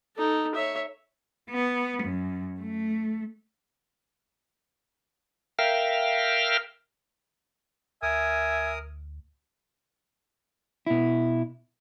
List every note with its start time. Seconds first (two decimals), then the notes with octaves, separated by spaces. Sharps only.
0.16 D#4 A4
0.55 C#5 E5
1.50 B3
2.02 F#2
2.59 A3
5.59 A#4 E5 F5 G5 F6
8.02 D2 A#4 E5 G#5 D#6
10.87 B2 E4